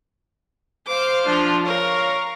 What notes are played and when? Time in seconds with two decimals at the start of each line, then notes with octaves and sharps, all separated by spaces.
0.87 C5 F5 D6 F6
1.26 F3 D4 F4
1.66 A#4 C#5 F5 A#5 C#6